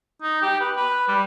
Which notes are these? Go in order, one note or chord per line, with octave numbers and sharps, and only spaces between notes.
D#4
G4
B4
B4
G3